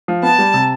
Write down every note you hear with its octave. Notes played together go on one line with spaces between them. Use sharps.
F3
B3 A5
G3
C3